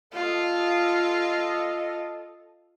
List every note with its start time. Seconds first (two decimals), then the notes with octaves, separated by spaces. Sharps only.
0.13 F4 A4 D#5